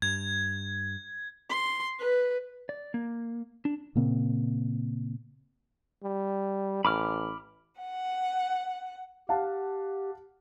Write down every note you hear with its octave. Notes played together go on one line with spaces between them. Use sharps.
G2 G#6
C6
B4
D5
A#3
D4
A#2 C#3 A#3 C4
G3
A1 B5 D6 F6
F#5
G4 F5 F#5 A5